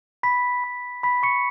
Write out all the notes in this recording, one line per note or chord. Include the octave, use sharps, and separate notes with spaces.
B5 B6
B5
B5 B6
C#6 C#7